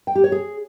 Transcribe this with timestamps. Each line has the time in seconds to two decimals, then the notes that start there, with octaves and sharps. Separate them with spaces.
0.07 G5
0.15 G4
0.24 C#5
0.32 G#4